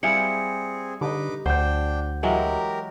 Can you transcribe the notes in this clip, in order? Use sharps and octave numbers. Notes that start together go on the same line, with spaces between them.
G3 C4 E4 G#4 F5 G#5 C#7
D3 D#4 G4 B4 D6
D2 D4 C5 F#5 G5 G6
E3 F#3 G#3 G4 A#4